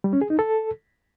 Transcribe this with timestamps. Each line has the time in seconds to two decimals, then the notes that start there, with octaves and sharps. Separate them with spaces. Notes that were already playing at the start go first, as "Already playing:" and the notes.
0.04 G3
0.13 C#4
0.22 G#4
0.30 D#4
0.39 A4